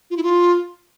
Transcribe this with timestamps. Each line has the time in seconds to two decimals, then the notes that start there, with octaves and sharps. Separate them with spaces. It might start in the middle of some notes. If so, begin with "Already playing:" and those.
0.10 F4
0.17 E4
0.23 F4